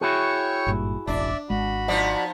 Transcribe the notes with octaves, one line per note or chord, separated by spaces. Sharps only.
E4 F#4 G#4 C#5 G5 C#6
G#1 G2 A#2
E1 A1 D4 D5 E5
G#1 G#3 F#4 B5
F3 B3 D#4 D5